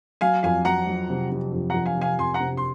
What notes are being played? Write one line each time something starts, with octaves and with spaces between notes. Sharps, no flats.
F#3 F5 G#5
F2 F5 G#5
F#3 F#5 A#5
F#3
C3
C3
F2
F2 F#5 A#5
F5 G#5
C3 F5 G#5
F2 G#5 C6
F#5 A#5
C3
C6